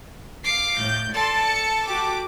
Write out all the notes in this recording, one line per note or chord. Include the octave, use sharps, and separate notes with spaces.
F5 D6 C7
A2 G6
A4 D5 A5 C6
C#7
F#4 G4 D6